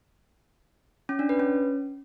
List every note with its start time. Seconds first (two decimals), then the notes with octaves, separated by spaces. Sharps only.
1.09 C#4
1.19 D4
1.29 B4
1.39 C#4